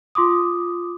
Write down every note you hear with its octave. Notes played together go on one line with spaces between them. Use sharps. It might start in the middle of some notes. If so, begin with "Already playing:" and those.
F4 C6 D6 D#6